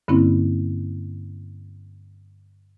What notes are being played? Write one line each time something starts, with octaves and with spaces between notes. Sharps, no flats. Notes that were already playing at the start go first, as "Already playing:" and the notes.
G2 D3 A#3 C4 C#4 E4